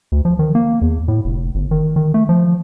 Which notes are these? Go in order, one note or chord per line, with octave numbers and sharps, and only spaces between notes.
D2
F3
D#3
A#3
E2
A2
F1
G1
D#3
D#3
A3
F3